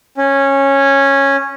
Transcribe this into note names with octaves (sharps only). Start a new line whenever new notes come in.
C#4